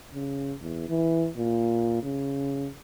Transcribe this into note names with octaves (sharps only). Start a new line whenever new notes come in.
C#3
E2
E3
A#2
C#3